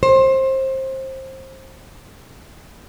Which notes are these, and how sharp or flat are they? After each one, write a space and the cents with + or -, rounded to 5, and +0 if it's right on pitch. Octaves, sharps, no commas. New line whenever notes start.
C5 +25